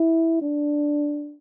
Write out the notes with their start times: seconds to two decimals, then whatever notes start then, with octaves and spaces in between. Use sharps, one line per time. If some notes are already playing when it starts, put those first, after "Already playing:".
Already playing: E4
0.42 D4